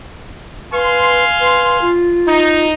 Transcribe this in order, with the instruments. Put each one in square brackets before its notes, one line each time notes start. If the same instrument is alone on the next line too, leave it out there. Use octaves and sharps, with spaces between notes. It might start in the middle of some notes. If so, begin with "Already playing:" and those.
[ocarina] B4 [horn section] F5 G#5 C6
[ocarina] B4
F4
[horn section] D#4